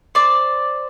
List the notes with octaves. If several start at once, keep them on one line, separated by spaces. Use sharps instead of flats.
C5 D5